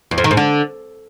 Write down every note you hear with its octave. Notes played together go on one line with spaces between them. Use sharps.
E2
F2
D#3
G#2
D3